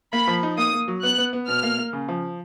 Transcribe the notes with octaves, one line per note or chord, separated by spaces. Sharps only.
A#3 B5
F3
D#4
A#3 D#6
A#3
F#3
B3 F#6
B3
B3
B2 F6
A#3
A#3
C#3
F3